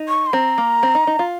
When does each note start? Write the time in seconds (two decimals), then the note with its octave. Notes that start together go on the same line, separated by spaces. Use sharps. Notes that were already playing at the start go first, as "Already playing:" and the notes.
Already playing: D#4
0.08 C#6
0.26 C6
0.33 C4 A#5
0.58 A#3
0.83 C4
0.95 D#4
1.07 D#4
1.19 F4